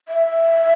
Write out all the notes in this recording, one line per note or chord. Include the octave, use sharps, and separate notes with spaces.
E5